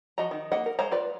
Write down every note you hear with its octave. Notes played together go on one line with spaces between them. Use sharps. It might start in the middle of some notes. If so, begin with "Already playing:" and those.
F3 F#4 D#5 A#5
D#3 D#4
A#3 D#5 F5 F#5
A#4
G#3 C5 C#5 F5 A#5
F4 B4 D5